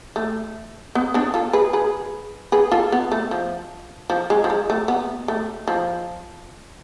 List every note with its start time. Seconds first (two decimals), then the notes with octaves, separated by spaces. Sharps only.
0.16 A3
0.95 B3
1.14 B3 D4
1.34 F4 A4
1.53 G#4 B4
1.73 G#4 B4
2.52 G#4 B4
2.71 F4 A4
2.92 B3
3.12 A3
3.31 F3
4.10 F3
4.30 G#3
4.44 F3
4.50 G#3
4.70 A3
4.88 B3
5.28 A3
5.68 F3